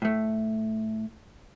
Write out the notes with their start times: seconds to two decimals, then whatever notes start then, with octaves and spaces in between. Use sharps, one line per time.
0.02 A2 A3